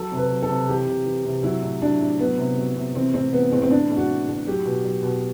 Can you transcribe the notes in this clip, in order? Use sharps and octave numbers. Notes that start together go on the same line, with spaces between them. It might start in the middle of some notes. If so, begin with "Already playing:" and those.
Already playing: F#3 A4
C3
B4
F#3
A4
C3
E3 G4
C3
E3
C3
F#3 E4
A2
F#3 D4
A2
F#3 B3
C3
F#3
C3
E3 C4
A2 C4
E3 B3
A2 C4
C4
E3 D4
A2
F#4
E3
A2
F#3 G4
B2
F#3
B2